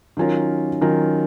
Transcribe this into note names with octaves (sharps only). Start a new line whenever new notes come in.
D#3 F#3 C#4 F4 A#4
D#3 F#3 C#4 F4 A#4